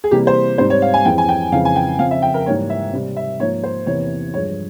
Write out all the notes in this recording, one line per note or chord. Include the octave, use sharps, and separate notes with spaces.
G#4
C3 E3 G3 A#3 G4
C5
G#2 G3 C4 C5
C#5
F5
G#5
F2 E3 G#3 C4 G5
G#5
G5
F2 C#3 E3 G#3 C4 F5
G#5
G5
F2 C#3 F3 C4 F5
E5
G5
A#4
G#2 E3 G3 A#3 C#5
E5
C3 G3 C4
E5
G#2 F3 A#3 C#5
C5
E2 C3 E3 A#3 C#5
G2 F3 G#3 C#5